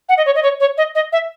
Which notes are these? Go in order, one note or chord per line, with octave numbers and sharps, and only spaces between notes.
F#5
D#5
C#5
D#5
C#5
C#5
D#5
D#5
E5